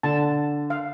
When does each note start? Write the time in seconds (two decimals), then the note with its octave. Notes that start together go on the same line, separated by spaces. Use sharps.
0.03 D3 A5
0.70 F5